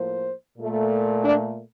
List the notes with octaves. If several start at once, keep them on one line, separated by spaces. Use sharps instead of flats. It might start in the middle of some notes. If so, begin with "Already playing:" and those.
Already playing: A2 F3 A#3 C5
A#2 A3
D4